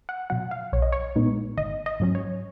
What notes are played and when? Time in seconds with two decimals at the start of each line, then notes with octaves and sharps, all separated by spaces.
0.09 F#5
0.30 B2 F#3 F#5
0.51 F5
0.73 B1 C#5
0.82 D#5
0.92 C#5
1.16 A#2 G#3 B3 D#4
1.57 G#1 D#5
1.86 D#5
2.00 G#2 F#3 C#4
2.15 C#5